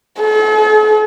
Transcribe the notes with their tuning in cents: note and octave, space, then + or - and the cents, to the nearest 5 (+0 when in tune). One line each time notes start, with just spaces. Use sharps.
A4 -45